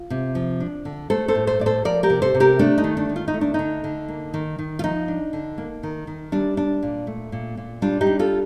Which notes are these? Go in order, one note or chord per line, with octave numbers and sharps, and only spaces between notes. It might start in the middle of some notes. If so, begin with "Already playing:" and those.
Already playing: F4
C3
F3
D4
D3
A3 A4 C5
A4 C5
A2
A4 C5
A2 D5
A4 C5
F3 A#4 D5
G4 A#4
C3
A4 C5
C3
G4 A#4
A3 D4
D#4
D#3
D4
D#3
F4
D#4
A3
D4
D3 D#4
D3
A#3
D#3
D#3
F4
F3 D#4
D4
D3
A#3
D#3
D#3
G3 D4
D4
A#2
A3
A#2
A#2
G3 D4 F4
D#4 G4
D4
F4 A4